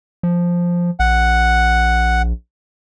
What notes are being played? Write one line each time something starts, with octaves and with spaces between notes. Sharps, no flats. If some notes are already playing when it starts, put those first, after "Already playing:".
F3
A#1 F#5